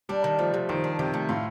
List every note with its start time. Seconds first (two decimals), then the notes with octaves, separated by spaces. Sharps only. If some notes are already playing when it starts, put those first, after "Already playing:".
0.09 G3 D4
0.24 D#3
0.39 F3 A3
0.54 C3
0.69 D#3 C5
0.84 D4
0.99 C3 G4
1.14 A3
1.29 A2 F4